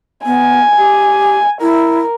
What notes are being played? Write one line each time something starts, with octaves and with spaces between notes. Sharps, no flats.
B3 G#5
G4
E4 A#4